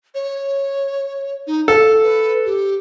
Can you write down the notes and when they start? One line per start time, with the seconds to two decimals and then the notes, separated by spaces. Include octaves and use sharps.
0.14 C#5
1.47 D#4
1.68 A4 F5
2.03 B4
2.45 G4